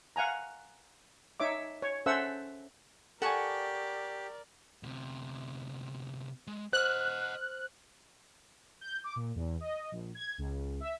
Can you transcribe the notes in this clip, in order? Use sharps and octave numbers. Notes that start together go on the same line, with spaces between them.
F5 F#5 G#5 A#5
D#4 C#5 E5 D6
C#5
C#4 A4 C5 E5 F#5 E6
G4 A4 A#4 D5 F#5 G#5 A5 C#6
D2 C3
G#3
C5 D#5 F#5 F6 F#6
G6
D6
A#2
E2
D#5
A#1
G#6
C#2
E5